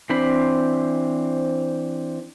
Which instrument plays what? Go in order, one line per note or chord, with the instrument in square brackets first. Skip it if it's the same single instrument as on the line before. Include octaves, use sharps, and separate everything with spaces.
[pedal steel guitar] E3 C4 D4 C5 B5